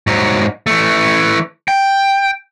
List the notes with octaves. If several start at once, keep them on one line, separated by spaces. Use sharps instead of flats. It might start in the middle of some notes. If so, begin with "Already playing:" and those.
G#2 F#3
E3 A3
G5